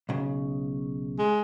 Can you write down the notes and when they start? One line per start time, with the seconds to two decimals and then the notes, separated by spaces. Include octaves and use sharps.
0.09 B1 C#3
1.19 G#3